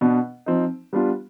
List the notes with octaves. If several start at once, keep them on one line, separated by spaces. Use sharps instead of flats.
B2 B3 D4
F3 C4 D#4
G3 B3 D4 F4